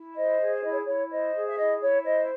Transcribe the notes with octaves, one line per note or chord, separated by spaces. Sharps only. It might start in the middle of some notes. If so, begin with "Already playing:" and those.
Already playing: E4
C5 D#5
G#4
E4 D#5
C#5
E4 C#5
C5 D#5
G#4
E5
E4 D#5
E4 C#5
C5 D#5